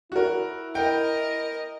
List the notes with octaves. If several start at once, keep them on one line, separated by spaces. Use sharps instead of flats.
E4 F#4 A#4
A#4 D#5 G5